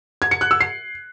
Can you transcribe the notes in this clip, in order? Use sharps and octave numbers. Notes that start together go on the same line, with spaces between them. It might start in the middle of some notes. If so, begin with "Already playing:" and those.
G#6
C#7
F#6
E6
C7